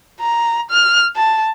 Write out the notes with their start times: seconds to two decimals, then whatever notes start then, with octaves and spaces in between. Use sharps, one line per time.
0.20 A#5
0.71 F6
1.16 A5